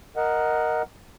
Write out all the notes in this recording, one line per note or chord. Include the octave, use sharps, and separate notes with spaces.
A#4 D#5 F#5